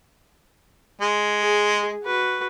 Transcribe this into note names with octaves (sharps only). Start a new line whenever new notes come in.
G#3
G#4
F#4 B4